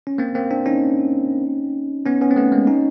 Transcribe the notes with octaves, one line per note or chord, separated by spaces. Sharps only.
C#4
A#3 C4
A#3 C4
C4 D4
C#4 D#4
B3 C#4
B3 C#4
C4
A3 B3
G#3 A#3
C#4 D#4